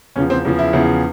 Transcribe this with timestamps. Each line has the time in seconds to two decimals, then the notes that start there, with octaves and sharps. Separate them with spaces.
0.16 E2 C#3 F3 C#4
0.30 C4
0.45 E2 C#3 F3
0.59 E4
0.73 E2 C#3 F3